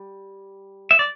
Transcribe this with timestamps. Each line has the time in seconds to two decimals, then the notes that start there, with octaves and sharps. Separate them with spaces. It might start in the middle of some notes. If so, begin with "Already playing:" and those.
Already playing: G3
0.91 E5
0.99 D5